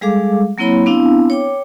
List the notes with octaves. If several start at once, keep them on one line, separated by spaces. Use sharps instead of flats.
G3 G#3 G#4 A4 F5 D6
F#3 A#3 C4 E4 C#5 B5
B3 C4 D4 E4 F5
C#5 G5 D6